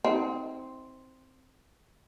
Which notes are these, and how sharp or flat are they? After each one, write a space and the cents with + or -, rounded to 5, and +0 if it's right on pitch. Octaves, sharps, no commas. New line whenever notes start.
C4 +0 D#4 +40